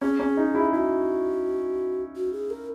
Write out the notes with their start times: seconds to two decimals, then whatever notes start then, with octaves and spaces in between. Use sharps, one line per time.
0.01 C#4 G#4
0.19 C#4
0.37 D#4
0.55 E4
0.73 E4 F#4
2.16 F#4
2.33 G#4
2.50 A#4